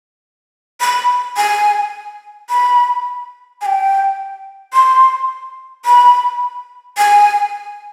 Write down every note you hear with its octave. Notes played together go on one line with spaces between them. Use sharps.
B5
G#5
B5
G#5
G5
C6
B5
G#5